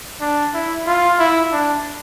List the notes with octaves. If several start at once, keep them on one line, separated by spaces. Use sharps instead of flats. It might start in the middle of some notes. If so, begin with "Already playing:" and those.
D4
E4
F4
E4
D4